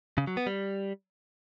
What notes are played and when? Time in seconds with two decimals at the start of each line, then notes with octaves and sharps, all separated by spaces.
0.18 C#3
0.27 F#3
0.37 B3
0.47 G3